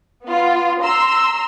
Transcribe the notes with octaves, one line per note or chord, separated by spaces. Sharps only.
B3 F4
A#5 C6 E6